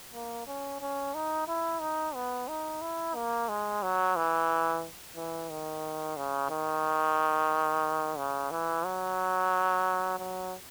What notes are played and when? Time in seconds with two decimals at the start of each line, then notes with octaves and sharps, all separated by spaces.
0.14 A#3
0.47 C#4
0.81 C#4
1.14 D#4
1.48 E4
1.81 D#4
2.15 B3
2.48 D#4
2.82 E4
3.15 A#3
3.49 G#3
3.83 F#3
4.16 E3
5.16 E3
5.50 D#3
6.17 C#3
6.50 D#3
8.18 C#3
8.51 E3
8.85 F#3
10.19 F#3